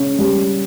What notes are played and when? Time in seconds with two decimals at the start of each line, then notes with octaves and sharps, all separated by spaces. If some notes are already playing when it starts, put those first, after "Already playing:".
Already playing: C#3 C#4
0.19 G3